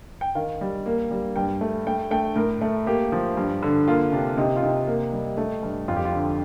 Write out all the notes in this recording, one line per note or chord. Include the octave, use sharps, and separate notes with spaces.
G5
D#3 F5
G3
A#3
G3
G2 G5
A3
A3 G5
A3 G5
A2 A#4
A3
A#3 G4
F3
G2
D3
A#3 F4
C3 D4
C3 D#4
F4
C3 D#4
A#3
G3
A3
G2
F2 F4
G4
F4
D3